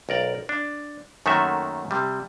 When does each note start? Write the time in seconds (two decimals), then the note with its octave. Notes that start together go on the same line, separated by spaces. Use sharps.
0.09 B1 A#4 D5
0.49 D4
1.26 F#2 D#3 A3 A#3 F#4 E5
1.91 C3 G3